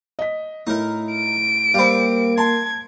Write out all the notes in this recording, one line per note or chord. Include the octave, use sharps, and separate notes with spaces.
D#5 B6
A2 D#4 E4 A#4
D7
G3 A#3 C4 F5 B5
A5 C6 G#6